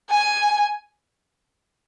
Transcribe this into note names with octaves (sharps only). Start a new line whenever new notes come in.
G#5